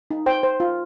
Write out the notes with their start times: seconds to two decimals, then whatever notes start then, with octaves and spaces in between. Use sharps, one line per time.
0.11 D#4
0.26 C5 G5
0.43 C5
0.60 F4